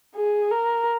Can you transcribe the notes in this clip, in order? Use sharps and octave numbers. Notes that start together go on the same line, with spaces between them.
G#4
A#4